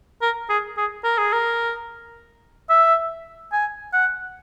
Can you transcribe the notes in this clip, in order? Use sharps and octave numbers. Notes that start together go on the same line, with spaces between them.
A#4
G#4
G#4
A#4
G#4
A#4
E5
G#5
F#5